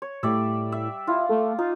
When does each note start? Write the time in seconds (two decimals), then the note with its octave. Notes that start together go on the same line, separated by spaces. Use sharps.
0.02 C#5
0.23 A2 G3 D5 E5
0.72 E5
1.07 E4 F4
1.29 A3
1.59 D#4 F4